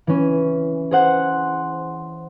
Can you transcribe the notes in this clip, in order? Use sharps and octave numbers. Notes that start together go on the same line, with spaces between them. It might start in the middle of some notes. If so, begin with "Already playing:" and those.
E3 C#4
G#4 C5 F#5